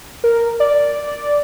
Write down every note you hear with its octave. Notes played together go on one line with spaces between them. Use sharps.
A#4
D5